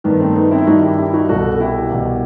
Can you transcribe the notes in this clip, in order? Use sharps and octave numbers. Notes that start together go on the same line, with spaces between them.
G2 D#3 B3
A3 C4
B3 D#4
C4 E4
E4
G2 D#3 D#4 F#4
E4 G4
E4 G4
E4
D#4 F#4
C2 B2 F#4 A4
A4
E4 G4
C2 B2